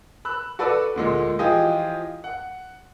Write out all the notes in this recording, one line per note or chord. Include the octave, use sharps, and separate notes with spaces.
B5 E6 F#6
F#4 A4 B4 D5 E6
D2 A#2 G#3
E3 F3 F4 G4 G#4 D#5
F#5